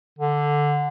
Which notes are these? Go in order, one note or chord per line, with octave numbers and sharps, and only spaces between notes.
D3